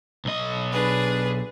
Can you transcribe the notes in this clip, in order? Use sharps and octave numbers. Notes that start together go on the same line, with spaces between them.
B1 D#5
D4 G#4 B4